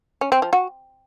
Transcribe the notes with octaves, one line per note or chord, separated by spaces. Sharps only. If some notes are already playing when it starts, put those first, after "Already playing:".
C#4
C4
F3
F#4